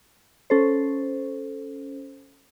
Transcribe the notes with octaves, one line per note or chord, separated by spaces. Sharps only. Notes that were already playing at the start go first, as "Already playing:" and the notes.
C#4 A4 C5